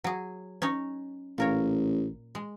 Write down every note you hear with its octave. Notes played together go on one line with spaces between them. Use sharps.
F#3 G#4
C#4 D#4 C#5
A1 A#2 A#4 C#5
G#3